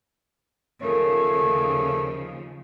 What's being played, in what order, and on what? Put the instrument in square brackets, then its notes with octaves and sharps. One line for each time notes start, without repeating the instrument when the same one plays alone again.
[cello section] D#2 C#3 F3 [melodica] A3 [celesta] A#4 C#5